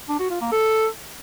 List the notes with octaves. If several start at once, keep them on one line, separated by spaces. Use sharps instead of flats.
D4
F#4
F4
A#3
A4